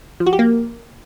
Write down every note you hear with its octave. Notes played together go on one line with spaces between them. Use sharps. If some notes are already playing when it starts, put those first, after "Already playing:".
F3
F#4
G4
A#3